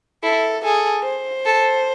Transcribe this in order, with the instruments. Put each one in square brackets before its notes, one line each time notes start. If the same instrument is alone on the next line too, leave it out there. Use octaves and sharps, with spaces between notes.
[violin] E4 [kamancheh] A4
[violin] G#4 [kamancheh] A4
[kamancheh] C5
[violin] A4